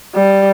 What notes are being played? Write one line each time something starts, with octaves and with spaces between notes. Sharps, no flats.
G3